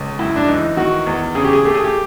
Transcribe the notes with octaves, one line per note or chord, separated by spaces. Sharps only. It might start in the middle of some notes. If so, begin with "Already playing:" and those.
Already playing: C#2
F#2 E4
D4
E3 D#4
D#3 F#4
E2
C#3 G#4
G4
G#4
A3 G4
G#4
G4